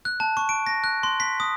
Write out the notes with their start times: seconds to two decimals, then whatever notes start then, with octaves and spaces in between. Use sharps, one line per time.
0.05 F#6
0.20 A5
0.37 C#6
0.49 D7
0.67 A#6
0.84 F#6
1.03 C6
1.20 B6
1.40 D#6